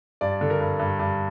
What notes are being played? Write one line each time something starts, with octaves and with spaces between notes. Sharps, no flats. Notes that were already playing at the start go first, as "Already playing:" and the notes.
G2 D5
D3
A#4
G2
G2
G2